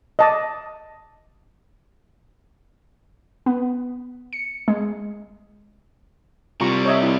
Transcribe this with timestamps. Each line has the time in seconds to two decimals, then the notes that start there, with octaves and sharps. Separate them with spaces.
0.19 D#5 A5 D6
3.46 B3
4.33 C#7
4.68 G#3
6.61 C3 G3 F4 A#5 C#6
6.85 C#5 D#5 E5
7.03 E4